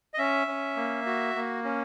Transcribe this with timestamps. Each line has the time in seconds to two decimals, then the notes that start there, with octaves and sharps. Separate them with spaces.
0.14 D#5
0.18 C#4 E5
0.47 C#4
0.76 A#3
1.06 F#4
1.35 A#3
1.64 C#4